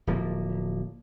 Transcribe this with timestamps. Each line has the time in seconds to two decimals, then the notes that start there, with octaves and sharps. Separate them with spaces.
0.07 D1 F3 A#3